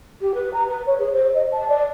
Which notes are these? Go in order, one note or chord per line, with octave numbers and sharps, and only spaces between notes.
G4
B4
A#5
B4
C#5
G#4
C5
D#5
A5
D5